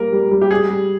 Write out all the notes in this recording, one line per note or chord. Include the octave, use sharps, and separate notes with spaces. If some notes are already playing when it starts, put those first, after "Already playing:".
Already playing: G3 A#3 A#4
G3
G3
G4
G3 G#4
G3